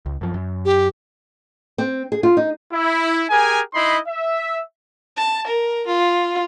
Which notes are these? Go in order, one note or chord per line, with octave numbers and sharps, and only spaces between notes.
C#2
F#2 F3
F#2
G4
C4
G#4
F4
D#4
E4
G4 G#4 A#4 G#5
D#4 E4 D#5 B5 C6
E5
A5
A#4
F4